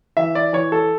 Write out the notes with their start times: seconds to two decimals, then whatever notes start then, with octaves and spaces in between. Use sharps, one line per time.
0.17 E3 E5
0.35 D5
0.53 E3 C#5
0.72 A4